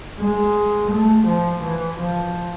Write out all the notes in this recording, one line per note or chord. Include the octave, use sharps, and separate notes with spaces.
G#3
A3
F3
E3
F3